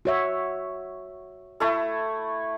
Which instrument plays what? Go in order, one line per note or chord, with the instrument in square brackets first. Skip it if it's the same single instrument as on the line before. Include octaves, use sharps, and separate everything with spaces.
[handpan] F#4 C#5 E5
[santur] A3 E4 A4